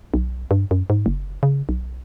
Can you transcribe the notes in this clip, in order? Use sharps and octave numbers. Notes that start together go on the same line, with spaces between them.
B1
G2
F#2
G#2
F#1
C#3
B1